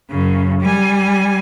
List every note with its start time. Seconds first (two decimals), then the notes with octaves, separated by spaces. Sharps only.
0.11 F#2 C#3
0.61 G3 G#5